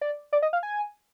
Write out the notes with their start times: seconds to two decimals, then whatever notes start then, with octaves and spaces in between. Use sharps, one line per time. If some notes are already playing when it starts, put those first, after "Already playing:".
0.01 D5
0.33 D5
0.42 D#5
0.53 F5
0.63 G#5